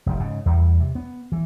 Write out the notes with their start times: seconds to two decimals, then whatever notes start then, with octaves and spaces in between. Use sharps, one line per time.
0.06 F1 D#3
0.19 G#2 C#3
0.46 E2 G3
0.80 C3
0.95 B3
1.32 E3